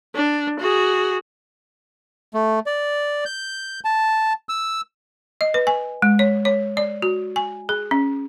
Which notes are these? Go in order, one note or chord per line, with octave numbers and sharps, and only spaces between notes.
D4
F#4 G#4
A3
D5
G6
A5
E6
D#5
B4
G#5
G#3
C#5
C#5
D5
F#4
G#5
G#4
C#4